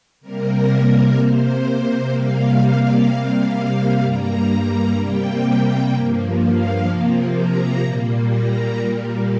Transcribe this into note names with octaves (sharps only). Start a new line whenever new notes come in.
C3 G3 A#3 A#4
C3 A#3 C5
C3 G3 A#3 F5
C3 G3 A#3 F5
G2 G3 A#3 A#5
C3 G3 A#3 G5
G2 F3 A#3
F5
C3 F3 A#3
A#5
A#2 G3 A#3
A#5
A#2 G3 A#3